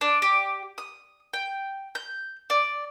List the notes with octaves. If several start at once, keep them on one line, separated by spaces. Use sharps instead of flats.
D4
G4
D#6
G5
G6
D5